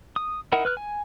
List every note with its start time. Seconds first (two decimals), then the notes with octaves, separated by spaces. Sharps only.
0.16 D#6
0.52 D#4 E4 A#4 F#5
0.65 B4 F6 F#6
0.77 G#5